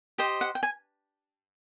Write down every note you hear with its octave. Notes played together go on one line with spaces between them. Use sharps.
G4 C5 D#5 G5
F#5
G5
G#5